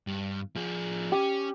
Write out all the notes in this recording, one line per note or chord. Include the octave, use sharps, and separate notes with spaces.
G2
F3 G#4
C#4 G4